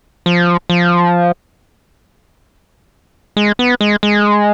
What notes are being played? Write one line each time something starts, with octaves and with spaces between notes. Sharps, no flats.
F3
F3
G#3
B3
G#3
G#3